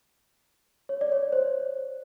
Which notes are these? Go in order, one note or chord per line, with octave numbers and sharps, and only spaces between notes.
C#5
D5
C#5
C5